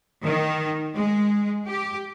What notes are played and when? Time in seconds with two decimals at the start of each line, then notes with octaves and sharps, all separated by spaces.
0.23 D#3
0.94 G#3
1.67 G4